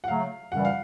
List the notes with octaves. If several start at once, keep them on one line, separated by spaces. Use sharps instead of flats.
F#5
C#3 F#3 A3 F5
F#2 C#3 E3 G3 F#5
F5